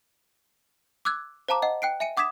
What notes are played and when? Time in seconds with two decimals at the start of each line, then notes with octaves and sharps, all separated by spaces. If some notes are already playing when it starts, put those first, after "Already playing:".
1.05 D6 E6 F#6 G#6
1.49 C5 F5 A5 A#5 D6
1.62 D#5 F#5
1.82 G5 F#6 C7 D7
2.00 E5 G#5 C#7 D#7
2.17 F#5 D6 D#6 G#6 B6 E7